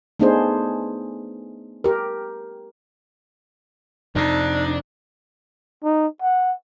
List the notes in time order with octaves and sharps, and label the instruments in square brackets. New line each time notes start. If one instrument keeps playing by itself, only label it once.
[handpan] A3 B3 D4 D#4 G#4 C5
G4 A#4
[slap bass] F2 C3 [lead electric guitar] D4 [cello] D#4
[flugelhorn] D#4
F#5